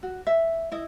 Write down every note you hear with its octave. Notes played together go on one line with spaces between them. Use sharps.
F#4
E5
E4 D#5